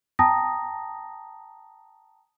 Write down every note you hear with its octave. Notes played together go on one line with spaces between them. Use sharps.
G5 A5 A#5 D#6 A#6